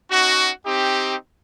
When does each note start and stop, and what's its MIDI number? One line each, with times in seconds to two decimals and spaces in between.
0.11 0.51 61
0.11 0.51 63
0.11 0.51 66
0.66 1.15 60
0.66 1.15 63
0.66 1.15 67